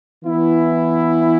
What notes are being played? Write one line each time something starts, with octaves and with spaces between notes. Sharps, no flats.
E3 B3 E4